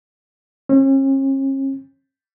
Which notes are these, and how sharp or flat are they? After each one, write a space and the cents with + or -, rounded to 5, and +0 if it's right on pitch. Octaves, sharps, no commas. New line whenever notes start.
C#4 -45